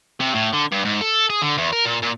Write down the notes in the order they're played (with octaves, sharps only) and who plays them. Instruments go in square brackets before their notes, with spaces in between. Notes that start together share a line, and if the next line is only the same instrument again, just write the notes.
[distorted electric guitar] C3
A2
D3
G2
G#2
A4
G#4
D3
E2
A#4
A#2
A#2